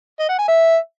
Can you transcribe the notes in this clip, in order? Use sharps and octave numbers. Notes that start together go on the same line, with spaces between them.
D#5
F#5
G#5
E5